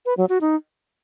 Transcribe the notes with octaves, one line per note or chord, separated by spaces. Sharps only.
B4
F#3
F#4
D#4